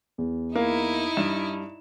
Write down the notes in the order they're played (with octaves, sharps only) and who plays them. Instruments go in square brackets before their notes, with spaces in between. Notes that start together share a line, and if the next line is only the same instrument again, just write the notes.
[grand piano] E2
[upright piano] A#3 [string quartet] D#4 E4
[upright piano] G2 [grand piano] E7